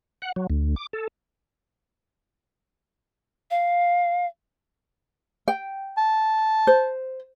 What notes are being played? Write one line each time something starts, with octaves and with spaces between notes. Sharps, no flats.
F#5
F#3
D2
D6
A4
F5
G5
A5
C5